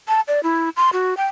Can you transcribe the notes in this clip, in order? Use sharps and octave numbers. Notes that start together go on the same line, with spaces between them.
A5
D5
E4
C6
F#4
G5